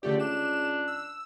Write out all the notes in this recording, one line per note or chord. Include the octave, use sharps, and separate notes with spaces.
C#2 D3 A3 G4 D5
D4 E7
E6